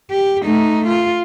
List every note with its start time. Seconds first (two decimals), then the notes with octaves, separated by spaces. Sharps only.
0.11 G4
0.45 A3 D#4
0.87 F4